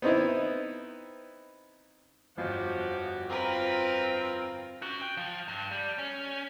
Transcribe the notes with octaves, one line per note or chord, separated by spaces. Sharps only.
B3 C4 D#4 E4
G1 F2 F3 F#4 G4
C4 F4 A#4 B4 A#5
C#4 F#4
G5
F3
G2
G3
C#4